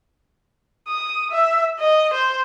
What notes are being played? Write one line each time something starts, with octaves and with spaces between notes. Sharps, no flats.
D#6
E5
D#5
C5